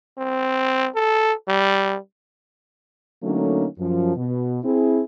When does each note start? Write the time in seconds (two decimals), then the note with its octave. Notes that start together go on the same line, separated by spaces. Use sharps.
0.18 C4
0.95 A4
1.48 G3
3.23 D3 F#3 A3 A#3 C#4 D#4
3.79 F#2 F3
4.16 B2
4.64 C4 E4 G#4